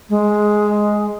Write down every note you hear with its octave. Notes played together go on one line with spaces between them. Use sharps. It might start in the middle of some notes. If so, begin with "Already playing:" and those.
G#3